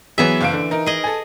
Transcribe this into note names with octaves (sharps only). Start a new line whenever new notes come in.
E3 F#3 B3 G#4 E5
F#1 F5 D7
D3
D#4 A#4
G#4 D#5
A4 G#5